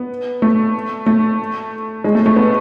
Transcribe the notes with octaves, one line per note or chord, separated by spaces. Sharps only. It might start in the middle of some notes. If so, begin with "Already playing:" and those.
Already playing: B3
A3
A3
G#3
A3
A3
B3